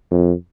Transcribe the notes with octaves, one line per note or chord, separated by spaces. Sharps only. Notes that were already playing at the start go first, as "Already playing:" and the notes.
F2